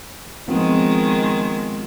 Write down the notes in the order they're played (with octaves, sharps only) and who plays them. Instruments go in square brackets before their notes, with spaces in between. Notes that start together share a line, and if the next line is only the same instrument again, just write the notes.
[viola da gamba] D#3 G#3 [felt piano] F3 B3 C4